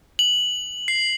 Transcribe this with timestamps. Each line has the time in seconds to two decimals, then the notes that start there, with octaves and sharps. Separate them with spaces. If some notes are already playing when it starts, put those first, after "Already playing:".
0.19 F#7
0.88 C7